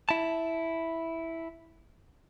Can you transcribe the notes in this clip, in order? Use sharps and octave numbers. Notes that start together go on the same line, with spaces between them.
E4 A5